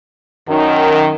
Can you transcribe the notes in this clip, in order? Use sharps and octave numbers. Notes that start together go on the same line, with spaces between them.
F#2 D#3